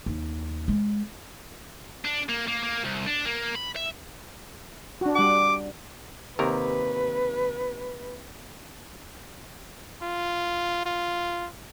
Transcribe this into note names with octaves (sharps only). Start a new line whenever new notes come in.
D#2
G#3
D4
A#3
A#3
A#3
C2
D4
A#3
B5
E5
D4 F#4
G3 F#5 D6
D#2 C3 A#4 B4
F4
F4